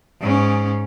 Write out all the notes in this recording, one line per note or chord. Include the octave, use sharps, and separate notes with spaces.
G#2 C#4